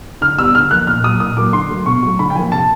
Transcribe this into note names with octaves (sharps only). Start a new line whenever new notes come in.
D3 F6
G3 B3 E6
D3 F6
F3 A#3 F#6
A#2 F6
F#3 A#3 D#6
A#2 D#6
F#3 A#3 D6
D3 C6
F#3 A3
B2 C#6
F#3 A3
D3 B5
G5
F3 A#3 G#5
C3 A5